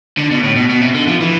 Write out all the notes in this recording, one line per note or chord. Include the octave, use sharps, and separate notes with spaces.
D3
B2
A2
B2
B2
C3
D3
F3
E3